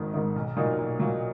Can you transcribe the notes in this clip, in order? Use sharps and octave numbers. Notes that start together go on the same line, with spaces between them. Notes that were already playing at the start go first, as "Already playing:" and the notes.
Already playing: G#1 G#2 D#3
G#2 D#3
B1
A#2 F#3 A#3 D#4
B1
A#2 F#3 A#3